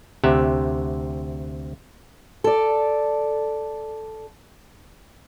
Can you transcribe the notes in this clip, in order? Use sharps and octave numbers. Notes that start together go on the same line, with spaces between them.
D2 C3 G4 E5 F#5
A4 D5